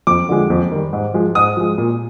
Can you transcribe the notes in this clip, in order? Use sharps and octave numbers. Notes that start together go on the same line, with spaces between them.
F2 D6
D3 F3 G#3
F2
D#3 G3
G#2
F3 G#3
G#2 D#6
F3 G#3
A#2